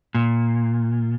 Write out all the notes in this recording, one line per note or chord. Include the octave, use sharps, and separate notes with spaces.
A#2